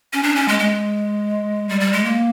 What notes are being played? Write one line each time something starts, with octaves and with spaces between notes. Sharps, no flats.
C#4
D4
C#4
G#3
G#3
G3
G3
G#3
A#3